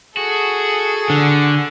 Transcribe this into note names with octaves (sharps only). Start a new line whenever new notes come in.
F#4 G#4 A4
D3